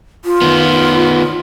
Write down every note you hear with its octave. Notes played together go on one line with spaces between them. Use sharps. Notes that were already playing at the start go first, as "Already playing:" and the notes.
F4
D#3 B3